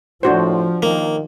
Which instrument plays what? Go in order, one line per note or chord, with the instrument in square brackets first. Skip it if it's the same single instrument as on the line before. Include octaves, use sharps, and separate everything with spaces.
[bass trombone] A2 [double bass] F3 [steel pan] D4 F#4 C5
[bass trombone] D#3 [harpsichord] A#3